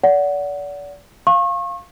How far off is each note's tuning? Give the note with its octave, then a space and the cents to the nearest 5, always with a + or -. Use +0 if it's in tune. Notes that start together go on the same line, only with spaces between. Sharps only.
D5 -35 F#5 +0
F5 +0 C#6 -35